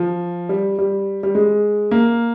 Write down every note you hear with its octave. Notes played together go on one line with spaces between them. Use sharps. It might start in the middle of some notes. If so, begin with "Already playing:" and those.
Already playing: F3
G3
G3
G3
G#3
A#3